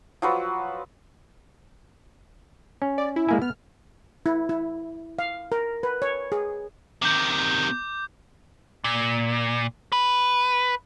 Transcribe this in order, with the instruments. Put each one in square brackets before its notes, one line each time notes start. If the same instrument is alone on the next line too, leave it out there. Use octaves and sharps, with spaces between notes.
[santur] F3 F#3 B4
[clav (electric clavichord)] C#4
[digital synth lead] D5
E4
[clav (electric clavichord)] G#3 A#3 G#5 [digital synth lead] E4
[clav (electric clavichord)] B3 [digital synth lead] F6
[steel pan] E4
E4
F5
A#4
B4
C#5
G#4
[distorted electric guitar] C3 D#3 [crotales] D6 G6
[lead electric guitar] A#2
B4